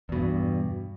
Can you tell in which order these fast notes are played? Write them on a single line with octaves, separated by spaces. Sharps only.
E2 B2 G2